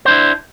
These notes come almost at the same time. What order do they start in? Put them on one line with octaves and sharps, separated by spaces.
C5 D4 E4